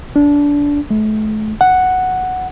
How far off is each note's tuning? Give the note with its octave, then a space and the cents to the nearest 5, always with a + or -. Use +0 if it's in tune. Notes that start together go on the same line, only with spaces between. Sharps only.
D4 -20
A3 -35
F#5 +0